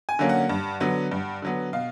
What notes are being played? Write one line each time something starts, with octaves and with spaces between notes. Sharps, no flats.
G#5
D3 F#3 A#3 C#4
F#5
G2
D3 F#3 B3
G2
D3 F#3 B3
B2 F5